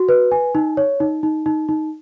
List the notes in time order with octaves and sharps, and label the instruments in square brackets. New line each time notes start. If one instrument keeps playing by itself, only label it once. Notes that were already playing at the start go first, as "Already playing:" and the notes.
Already playing: [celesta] F#4
B4
G#5
D#4
C#5
D#4
D#4
D#4
D#4